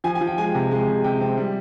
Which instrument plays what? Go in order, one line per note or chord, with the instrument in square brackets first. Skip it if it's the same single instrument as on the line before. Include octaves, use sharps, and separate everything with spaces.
[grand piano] F3 G#5
G#5
F3
G5
G#3 G#5
C3
G#3
C3
C3 G5
C4
G3